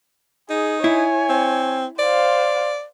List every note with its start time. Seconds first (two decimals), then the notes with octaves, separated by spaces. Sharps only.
0.50 D#4 G#4
0.84 E4 C#5 G#5
1.29 C4
1.99 C5 D5 F5